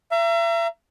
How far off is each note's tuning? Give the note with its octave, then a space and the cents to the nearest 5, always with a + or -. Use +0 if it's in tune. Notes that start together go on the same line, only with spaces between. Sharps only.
E5 +40 A#5 +0